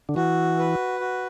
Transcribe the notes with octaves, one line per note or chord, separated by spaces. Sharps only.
D3
E3 F#4
B4
F#4